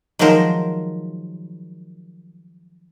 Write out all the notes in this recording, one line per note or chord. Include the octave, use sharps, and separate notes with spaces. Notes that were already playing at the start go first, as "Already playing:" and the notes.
D#3 F3 F#3 G#3 A#4 C5